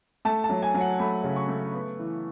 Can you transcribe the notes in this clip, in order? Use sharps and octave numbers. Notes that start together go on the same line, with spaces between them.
A3 A5
A5
F#3
G#5
F#3
F#5
A3 B5
C#3
C#6
A3
B3
E3